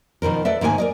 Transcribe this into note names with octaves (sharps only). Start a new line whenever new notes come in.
B2 D#3 F3 A#4
A4 B4 D5 E5
G#2 D#3 A#3 A#4 G#5
A#4 D5 D#5